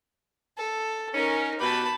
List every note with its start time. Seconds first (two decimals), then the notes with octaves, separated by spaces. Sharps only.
0.58 A4
1.14 C#4 D#4 A#4
1.60 B2 G4 B4 A5 B5